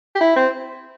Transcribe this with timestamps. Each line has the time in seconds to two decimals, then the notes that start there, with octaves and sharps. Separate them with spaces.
0.15 G4
0.21 E4
0.36 C4